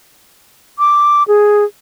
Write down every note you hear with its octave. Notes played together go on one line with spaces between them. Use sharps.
D6
G#4